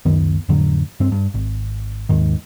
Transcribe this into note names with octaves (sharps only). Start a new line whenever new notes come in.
C#2 F#2 D#3 B3
F2 A2 D3 F#3
G2 C4
G2
G#1
D#2 G#2 D#3